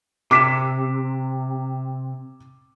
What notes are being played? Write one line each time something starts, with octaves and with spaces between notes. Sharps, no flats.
C3 D6 B6 E7